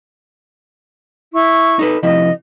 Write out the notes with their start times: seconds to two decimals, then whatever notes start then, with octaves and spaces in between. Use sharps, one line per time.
1.33 E4 C#6
1.79 D#4 A4 B4
2.03 C3 F3 E4 D#5